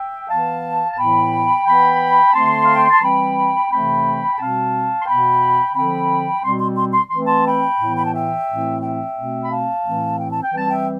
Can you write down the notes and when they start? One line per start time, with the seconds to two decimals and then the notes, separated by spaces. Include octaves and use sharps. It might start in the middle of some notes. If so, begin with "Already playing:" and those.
Already playing: E5 G5
0.28 E3 B3 F5 A5
0.92 A5
0.96 A2 E3 B3 G5 B5
1.65 E3 B3 G5 B5
2.33 D3 A3 C4 A5 C6
2.62 F5
2.75 G5
2.89 A5
3.02 E3 G3 C4 G5 B5
3.69 C3 E3 A3 C4 G5 B5
4.33 G5
4.38 B2 G3 C4 F5 A5
5.02 C6
5.06 B2 B3 G5 B5
5.75 D3 F3 C4 G5 B5
6.42 B2 G3 C4 C6
6.59 C6
6.76 C6
6.93 C6
7.09 E3 A3 C4 C6
7.26 A5 C6
7.45 G5 B5
7.80 A2 E3 B3
7.96 B5
8.05 A5
8.13 E5 G5
8.48 A2 E3 A3 C4
8.82 E5 G5
9.16 B2 A3 C4
9.42 B5
9.50 F5 A5
9.84 A2 E3 A3 C4
10.18 G5
10.31 A5
10.43 G5
10.52 E3 G3 C4 A5
10.68 E5 G5